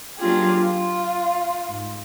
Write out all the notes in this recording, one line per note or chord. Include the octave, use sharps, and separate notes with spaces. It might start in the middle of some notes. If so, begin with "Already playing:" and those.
F#3 A#3 D4 F4 G4 G#4
F4
G#2